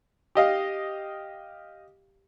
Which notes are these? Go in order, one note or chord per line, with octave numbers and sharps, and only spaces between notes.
G4 D#5 F5